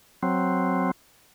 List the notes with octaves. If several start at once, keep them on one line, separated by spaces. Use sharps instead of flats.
F#3 C4